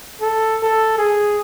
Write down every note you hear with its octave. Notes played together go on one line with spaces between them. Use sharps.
A4
A4
G#4